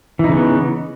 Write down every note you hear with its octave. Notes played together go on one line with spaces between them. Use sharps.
C#3 E3 B3 D#4